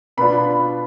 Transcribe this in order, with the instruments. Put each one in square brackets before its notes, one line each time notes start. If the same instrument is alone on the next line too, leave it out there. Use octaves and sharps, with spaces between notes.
[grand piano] B2 B3 D4 F4 B5